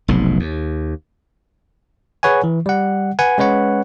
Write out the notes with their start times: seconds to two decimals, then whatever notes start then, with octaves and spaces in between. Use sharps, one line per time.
0.08 F1 B1 G#2
0.40 D#2
2.23 G#4 B4 C#5 F#5 G#5
2.44 E3
2.66 G3 F#5
3.19 B4 F#5 G#5
3.38 G#3 C#4 B4 C#5 F#5